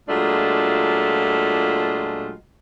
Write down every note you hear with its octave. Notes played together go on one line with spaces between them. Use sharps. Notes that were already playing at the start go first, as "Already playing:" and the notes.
A#2 F#3 G#3 A3 D4 F4